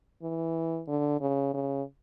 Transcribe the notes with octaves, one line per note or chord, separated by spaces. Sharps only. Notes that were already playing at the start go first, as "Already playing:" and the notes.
E3
D3
C#3
C#3